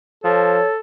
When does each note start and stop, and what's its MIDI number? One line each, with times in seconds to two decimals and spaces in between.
0.24 0.61 53
0.24 0.79 69
0.24 0.68 73